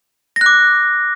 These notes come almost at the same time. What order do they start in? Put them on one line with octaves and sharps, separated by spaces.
A#6 F#6 D6